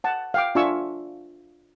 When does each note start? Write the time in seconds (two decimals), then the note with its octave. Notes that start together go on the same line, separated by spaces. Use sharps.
0.04 F#5 A5
0.34 F5 G5 D6
0.55 D4 F4 E5 G#5 C#6 E6